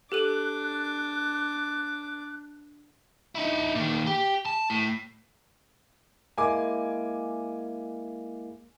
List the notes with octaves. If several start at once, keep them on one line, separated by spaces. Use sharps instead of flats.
D4 G4 A4 D6 F#6 D#7
D#4 E4
A#2 D#3
G4
A5
A2
G#3 A#3 E4 G#5 D6